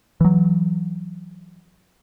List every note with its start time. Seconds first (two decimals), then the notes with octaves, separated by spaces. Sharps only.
0.21 E3 F#3